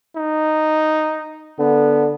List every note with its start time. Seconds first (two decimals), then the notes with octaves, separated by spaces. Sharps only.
0.16 D#4
1.59 D3 B3